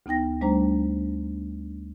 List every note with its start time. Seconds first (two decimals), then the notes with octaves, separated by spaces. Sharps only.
0.06 D2 B3 D#4 G5 A#6
0.41 D2 G3 A3 D4 C5 A#5